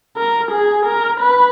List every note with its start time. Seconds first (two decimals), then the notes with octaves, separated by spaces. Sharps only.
0.17 A#4
0.51 G#4
0.86 A#4
1.20 B4